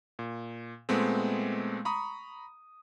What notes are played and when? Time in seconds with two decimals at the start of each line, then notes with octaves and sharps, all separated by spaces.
0.19 A#2
0.89 A#2 G#3 A3 B3 C4
1.85 A#5 B5 C#6 D#6